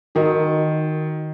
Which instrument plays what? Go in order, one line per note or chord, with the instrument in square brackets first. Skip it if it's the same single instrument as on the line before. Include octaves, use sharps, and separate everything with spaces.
[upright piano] D#3 [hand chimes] D#4 F#4 A#4 D#5